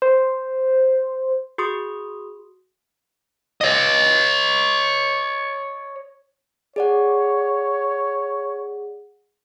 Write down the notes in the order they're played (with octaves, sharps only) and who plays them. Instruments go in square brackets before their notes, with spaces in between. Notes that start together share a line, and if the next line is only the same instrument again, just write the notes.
[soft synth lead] C5
[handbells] F#4 G#4 C6 D#6
[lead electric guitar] C#5 D#5
[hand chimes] G#4 D5 F#5 [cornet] C#5